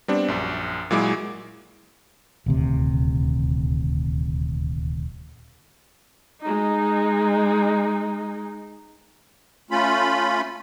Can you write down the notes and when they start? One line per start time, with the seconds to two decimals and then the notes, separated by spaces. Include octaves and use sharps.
0.08 G3 B3 C4 D4
0.28 A#1 F#2
0.91 A#2 F#3 G#3 E4 D6
2.46 D#1 D2 C3
6.41 G#3 D#4
9.71 A3 C#4 F4 B5